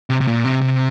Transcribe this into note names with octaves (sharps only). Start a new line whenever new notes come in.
C3
C3
A#2
C3
C3